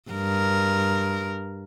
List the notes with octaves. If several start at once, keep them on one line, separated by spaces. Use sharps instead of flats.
G2 A#4